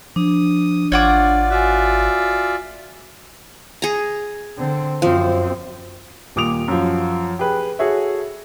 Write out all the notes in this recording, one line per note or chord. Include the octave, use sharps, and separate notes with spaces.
F3 D4 D#6
G#1 F4 C#5 D5 F#5 D6
F4 F#4 D5 E5 G#5
G#4 A#5
D3 C4
F#2 F3 C4
D#1 A#2 D6 D#6 D7 F7
F#2 F3
G4 G#4 B4
F#4 G#4 A4 C#5 E5